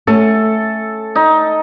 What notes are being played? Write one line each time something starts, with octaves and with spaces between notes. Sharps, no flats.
A3 C#4 A4
D#4